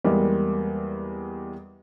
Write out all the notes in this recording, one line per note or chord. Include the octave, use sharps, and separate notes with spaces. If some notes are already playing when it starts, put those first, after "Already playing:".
E2 G3 G#3 A#3